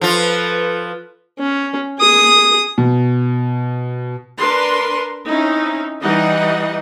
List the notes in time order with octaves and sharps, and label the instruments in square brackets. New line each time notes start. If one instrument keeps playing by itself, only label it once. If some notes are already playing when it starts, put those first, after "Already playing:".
[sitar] F3 F4 [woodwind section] A4 B4
[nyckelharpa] C#4
G#4 D#6
[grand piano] B2
[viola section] D4 A#4 B4 C6
C4 C#4 D#4 E4
E3 G3 D#4 D#5 F#5